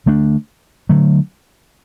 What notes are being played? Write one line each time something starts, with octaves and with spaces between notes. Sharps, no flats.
D3 A3 D4
D3 F#3 A3